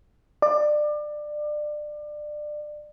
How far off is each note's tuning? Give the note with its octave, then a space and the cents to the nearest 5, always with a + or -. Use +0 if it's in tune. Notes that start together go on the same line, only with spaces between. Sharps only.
D5 +25